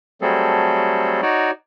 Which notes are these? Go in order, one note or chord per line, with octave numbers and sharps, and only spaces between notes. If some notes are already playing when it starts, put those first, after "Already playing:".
F#3 G3 A3 C4 G#4 A4
D#4 F#4 C#5 D5